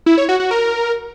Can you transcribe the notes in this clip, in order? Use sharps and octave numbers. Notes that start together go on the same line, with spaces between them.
E4
C#5
F#4
F#4
A#4